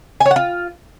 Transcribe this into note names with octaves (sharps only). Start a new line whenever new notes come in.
G#5
C#5
F#5
F4